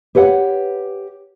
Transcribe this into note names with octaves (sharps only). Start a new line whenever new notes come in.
G4 B4 C#5 F#5